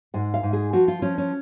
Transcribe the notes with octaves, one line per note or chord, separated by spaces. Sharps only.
G#2 F#5
F5
G#2
G#4
F3 F#4
F4
F3 C#4
C#4